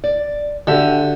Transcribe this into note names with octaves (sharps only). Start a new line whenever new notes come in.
D5
D3 F#4 G4 E5